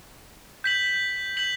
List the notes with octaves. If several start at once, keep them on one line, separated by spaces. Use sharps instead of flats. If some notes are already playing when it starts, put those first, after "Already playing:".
G6 B6 F#7
G6 B6 F#7